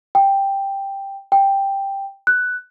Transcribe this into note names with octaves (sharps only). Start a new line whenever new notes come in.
G5
G5
F#6